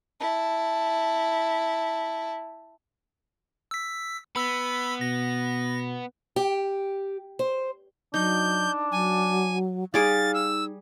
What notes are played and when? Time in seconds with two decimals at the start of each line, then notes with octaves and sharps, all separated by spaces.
0.20 E4 A5
3.71 E6 B6
4.36 B3 B5 E6 B6
5.01 B2 A#6
6.36 G4
7.39 C5
8.14 F#3 D4 D#4 G6
8.92 F#3 G#5
9.94 G3 D#4 G#4 F5 D6 A6
10.34 E6